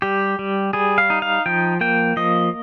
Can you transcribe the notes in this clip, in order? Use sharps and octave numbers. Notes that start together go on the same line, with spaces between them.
G3 G4
G3
G3 G#4
F5
D#4
F5
F3 G5
A#3 G5
F3 D#5